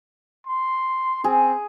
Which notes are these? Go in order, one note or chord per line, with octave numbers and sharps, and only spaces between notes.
C6
C4 G#4